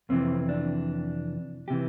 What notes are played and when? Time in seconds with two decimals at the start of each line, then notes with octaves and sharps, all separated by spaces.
0.09 F2 C3 E3 C4
0.49 D4
1.68 C3 E3 G4